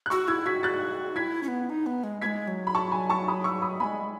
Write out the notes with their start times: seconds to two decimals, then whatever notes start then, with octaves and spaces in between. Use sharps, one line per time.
0.06 F#6
0.10 F#4 C#6 E6
0.28 E4 E6 G#6
0.46 F#4 G#6 B6
0.63 F#6 A6
1.16 E4 G#6 B6
1.43 C#4
1.48 B3
1.70 D#4
1.86 B3
2.04 G#3
2.21 B3 G#6 B6
2.26 G#3
2.48 F#3
2.67 B5
2.75 A5 C#6
2.92 G#5 B5
3.09 A5 C#6
3.28 B5 D#6
3.44 C#6 E6
3.62 B5 D#6
3.80 G#3 B3 G#5 B5